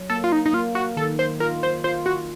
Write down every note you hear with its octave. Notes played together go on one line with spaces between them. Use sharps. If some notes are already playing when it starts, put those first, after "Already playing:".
Already playing: F#3
A#3 A4
F4
D#4
D#4
A#3 F4
F#4
D#3 A4
C5
F4 A#4
C5
F4 C5
F#4